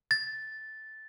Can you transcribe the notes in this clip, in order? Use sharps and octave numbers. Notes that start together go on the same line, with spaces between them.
A6